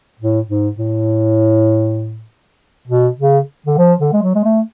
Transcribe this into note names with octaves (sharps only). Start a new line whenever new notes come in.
A2
G#2
A2
B2
C#3
D3
F3
D3
G#3
F#3
G#3
A3